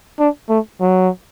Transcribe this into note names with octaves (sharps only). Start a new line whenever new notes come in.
D4
A3
F#3